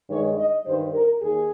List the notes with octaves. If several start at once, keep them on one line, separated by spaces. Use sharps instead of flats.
G2 D#3 G#3 C#5
D#5
G2 D#3 G3 C5
A#4
D#2 G#4